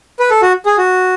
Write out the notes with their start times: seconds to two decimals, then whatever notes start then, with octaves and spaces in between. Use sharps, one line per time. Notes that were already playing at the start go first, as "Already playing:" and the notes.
0.20 B4
0.31 A4
0.42 F#4
0.66 G#4
0.78 F#4